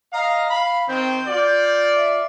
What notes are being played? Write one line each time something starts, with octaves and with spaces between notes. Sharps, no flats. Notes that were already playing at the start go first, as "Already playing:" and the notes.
D#5 F5 A#5
F5 B5
D#3 C4 G6
F4 D5
E5